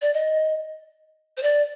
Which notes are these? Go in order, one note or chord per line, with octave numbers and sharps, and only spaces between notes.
D5
D#5
C5
D5